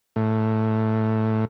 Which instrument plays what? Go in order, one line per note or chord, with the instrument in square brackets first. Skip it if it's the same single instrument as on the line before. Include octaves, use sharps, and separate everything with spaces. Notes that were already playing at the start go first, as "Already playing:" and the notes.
[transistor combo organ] A2